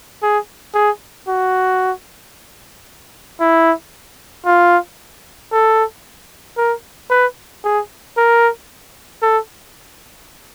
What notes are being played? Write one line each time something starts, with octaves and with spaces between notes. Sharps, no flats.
G#4
G#4
F#4
E4
F4
A4
A#4
B4
G#4
A#4
A4